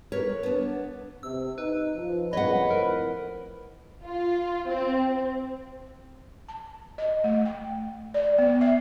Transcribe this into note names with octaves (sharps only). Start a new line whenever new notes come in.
A#4 B4 C#5
B3 D4
C3 E6
D#4 B4
F3
F2 C#3 A#3 B4 C#5 D#5 F#5
F2 A2 A#4 C5
F4
C4
A5
D#5
A3
G5
D5
B3
E5